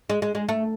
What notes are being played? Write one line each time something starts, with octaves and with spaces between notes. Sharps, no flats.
G#3
G#3
G#3
A3